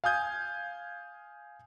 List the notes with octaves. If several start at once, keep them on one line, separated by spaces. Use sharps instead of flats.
F5 G#5 D#6 G6 G#6